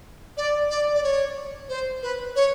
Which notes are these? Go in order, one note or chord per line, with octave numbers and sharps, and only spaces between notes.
D5
D5
D5
C#5
C5
B4
C#5